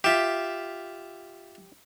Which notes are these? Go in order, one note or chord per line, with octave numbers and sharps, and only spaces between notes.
F4 G4 E5